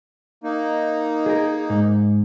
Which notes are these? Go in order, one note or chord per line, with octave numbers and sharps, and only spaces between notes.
A#3 D#4
G#4 A#4
G#2